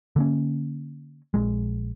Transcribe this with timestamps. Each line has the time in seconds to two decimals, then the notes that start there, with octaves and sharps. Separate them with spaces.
0.16 D3 A#3 C#4
1.34 A#1 G#3